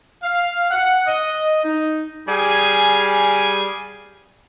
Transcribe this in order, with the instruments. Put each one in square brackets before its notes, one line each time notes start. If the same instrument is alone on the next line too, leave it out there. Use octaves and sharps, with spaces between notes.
[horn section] F5
F#5
D#5
D#4
G3 G#4 D5 F5 G#5